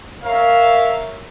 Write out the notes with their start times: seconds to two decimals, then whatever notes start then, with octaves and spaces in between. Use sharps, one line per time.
0.24 A#4 C#5 E5 F5